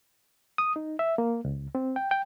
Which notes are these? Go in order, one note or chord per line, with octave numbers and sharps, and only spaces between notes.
D#6
D#4
E5
A#3
C#2
C4
G5
G5